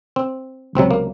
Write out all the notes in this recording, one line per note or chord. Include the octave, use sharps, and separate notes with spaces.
C4
C#2 C3 F#3 C4
A#3